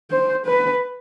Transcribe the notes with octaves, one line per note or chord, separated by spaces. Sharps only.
C5
B4